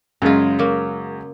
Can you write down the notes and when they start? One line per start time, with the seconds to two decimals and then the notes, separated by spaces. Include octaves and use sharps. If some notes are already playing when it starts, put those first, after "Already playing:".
0.22 F#2 C#3 G#3 F4
0.59 F#3 A#3